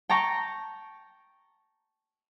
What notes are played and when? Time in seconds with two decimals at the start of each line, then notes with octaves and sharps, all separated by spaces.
0.10 G5 A5 A#5 C#6